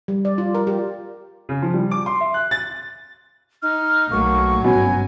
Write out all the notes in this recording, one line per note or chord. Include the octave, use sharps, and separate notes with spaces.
G3
D5
F4
A#4
G4
C#3
F3
G3
D6
C6
E5
F#6
A6
D#4 F6
B1 F#3 A3 A#3 C#6
G1 G#2 B2 C#4 G#5